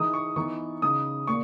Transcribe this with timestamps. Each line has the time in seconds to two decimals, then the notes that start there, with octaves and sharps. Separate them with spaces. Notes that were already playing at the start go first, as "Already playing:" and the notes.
Already playing: E3 G#3 D#4 D#6
0.13 C#6
0.36 E3 B3 D#4 C#6
0.82 C#3 G#3 D#4 D#6
1.27 A#2 C#6